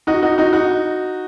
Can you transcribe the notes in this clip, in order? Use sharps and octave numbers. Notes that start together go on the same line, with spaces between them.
D#4 F#4
D#4 F#4
D#4 F#4
D#4 F#4